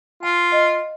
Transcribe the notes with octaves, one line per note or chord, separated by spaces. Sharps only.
F4 G#5
D#5